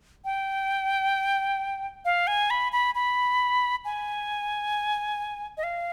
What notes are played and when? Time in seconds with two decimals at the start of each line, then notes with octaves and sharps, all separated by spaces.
0.25 G5
2.05 F5
2.27 G#5
2.50 B5
2.72 B5
2.95 B5
3.85 G#5
5.57 D#5
5.63 F5